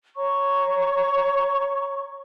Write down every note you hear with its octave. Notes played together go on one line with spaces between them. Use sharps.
C#5 A#5 C#6